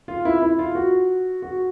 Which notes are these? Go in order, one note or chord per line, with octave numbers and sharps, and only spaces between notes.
F4
E4
E4
F4
F#4
F#4